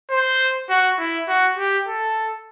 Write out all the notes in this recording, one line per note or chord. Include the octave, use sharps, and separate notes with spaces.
C5
F#4
E4
F#4
G4
A4